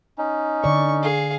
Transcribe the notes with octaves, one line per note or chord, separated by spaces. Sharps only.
C#4 D#4
D3 D5 C#6
G#4 F5